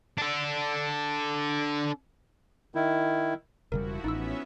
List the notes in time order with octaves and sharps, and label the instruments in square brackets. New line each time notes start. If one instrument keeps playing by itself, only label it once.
[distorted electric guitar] D4 A4
[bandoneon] D#3 E4
[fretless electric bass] E1 C#3 G3 [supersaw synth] F3 E4 F#4 [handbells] A#4
[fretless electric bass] A1 [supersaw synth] B3 C#4 E5 [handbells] D#4 E6